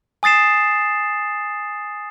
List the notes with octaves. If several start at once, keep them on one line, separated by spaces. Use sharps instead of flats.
G#5 D#6 A6 C7 E7